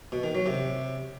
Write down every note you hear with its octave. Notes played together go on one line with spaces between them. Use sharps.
B2
D#3
F#3
C3